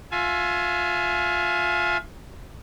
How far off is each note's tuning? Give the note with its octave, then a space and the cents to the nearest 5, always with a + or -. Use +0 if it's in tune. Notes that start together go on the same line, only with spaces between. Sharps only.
F4 +20 E5 +30 G#5 +30